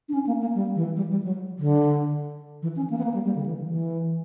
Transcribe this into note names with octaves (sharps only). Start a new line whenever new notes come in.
D4
C#4
A#3
A#3
G3
E3
G3
G3
F#3
D3
E3
C#4
A#3
B3
A#3
G3
G3
D3
E3
E3